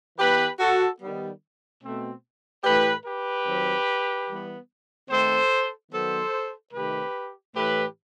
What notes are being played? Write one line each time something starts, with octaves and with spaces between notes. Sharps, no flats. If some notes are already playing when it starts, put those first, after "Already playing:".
E3 B3 G4 B4
F#4 A4
D#3 G3 B3
B2 A3 C4
A2 E3 A3 G4 B4
G4 B4
D#3 F#3 C4
E3 G3 B3
D#3 A3 C4 A4 C5
D#3 F#3 B3 A4 C5
C3 D#3 A3 C4 G4 B4
A2 E3 A3 G4 B4